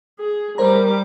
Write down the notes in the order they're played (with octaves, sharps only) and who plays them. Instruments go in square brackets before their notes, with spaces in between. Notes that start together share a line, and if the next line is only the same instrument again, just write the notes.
[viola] G#4
[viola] G3 D6 [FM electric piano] A#4 C5 A#5